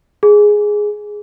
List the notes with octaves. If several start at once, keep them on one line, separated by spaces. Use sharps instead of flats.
G#4